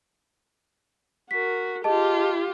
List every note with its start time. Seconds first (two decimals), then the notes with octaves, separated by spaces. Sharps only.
1.31 F#4 A#4 B6
1.84 F4 G4 G#4 D#5 A5